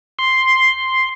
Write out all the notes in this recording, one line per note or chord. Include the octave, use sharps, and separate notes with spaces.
C6